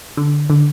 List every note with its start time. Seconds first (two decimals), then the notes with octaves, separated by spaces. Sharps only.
0.17 D3
0.50 D3